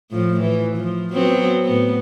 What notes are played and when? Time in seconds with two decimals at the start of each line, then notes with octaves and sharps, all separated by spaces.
0.11 A2 F3
0.41 E3
0.76 F3
1.13 F#3 B3 C4
1.65 A2 B3